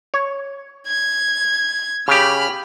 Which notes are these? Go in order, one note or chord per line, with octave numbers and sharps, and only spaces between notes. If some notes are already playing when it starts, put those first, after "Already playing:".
C#5
G#6
C#3 G4 B5 F6